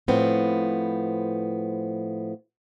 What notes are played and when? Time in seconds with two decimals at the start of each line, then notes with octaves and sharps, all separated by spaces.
0.08 A2 F3 B3 C4